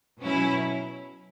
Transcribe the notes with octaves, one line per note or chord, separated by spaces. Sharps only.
B2 F#3 C#4 E4